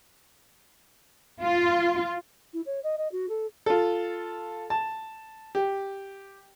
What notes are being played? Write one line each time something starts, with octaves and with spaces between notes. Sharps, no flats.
F4
E4
C#5
D#5
D#5
F#4
A4
F4 A4
A5
G4